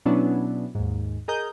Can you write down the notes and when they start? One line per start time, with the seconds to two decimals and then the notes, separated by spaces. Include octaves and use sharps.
0.05 B2 F#3 B3 C#4 D4 E4
0.75 D#2 G#2
1.28 G#4 A#4 D#5 A#5 D#6 G6